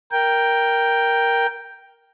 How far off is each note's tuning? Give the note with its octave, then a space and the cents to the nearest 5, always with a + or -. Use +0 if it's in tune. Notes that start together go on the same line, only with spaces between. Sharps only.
A#4 +5 G5 +0